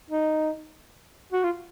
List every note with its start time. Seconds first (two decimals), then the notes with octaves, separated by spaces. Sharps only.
0.10 D#4
1.32 F#4
1.44 F4